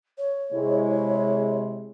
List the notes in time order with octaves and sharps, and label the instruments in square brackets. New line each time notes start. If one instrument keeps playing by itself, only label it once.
[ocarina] C#5
[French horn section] C3 G#3 E4